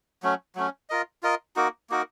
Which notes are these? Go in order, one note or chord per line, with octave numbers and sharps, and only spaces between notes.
F#3 A3 C#4
F#3 A3 C#4
F4 A#4 D#5
F4 A#4 D#5
A#3 D#4 F#4 A#4
A#3 D#4 F#4 A#4